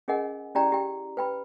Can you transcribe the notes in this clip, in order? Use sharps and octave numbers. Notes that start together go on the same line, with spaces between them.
C#4 G#4 A#4 D#5 F#5 G#5
C#4 E4 G4 D5 G5 A#5
G4 G5
B4 G5 B5